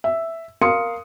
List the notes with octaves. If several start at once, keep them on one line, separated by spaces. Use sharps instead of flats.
E5
A#4 F5 C6 D#6 C#7